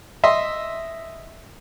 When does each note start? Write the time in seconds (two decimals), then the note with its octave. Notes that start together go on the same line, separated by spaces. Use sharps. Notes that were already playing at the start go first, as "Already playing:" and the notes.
0.24 D#5 E5 C6